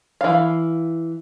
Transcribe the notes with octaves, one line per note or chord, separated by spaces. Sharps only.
E3 F5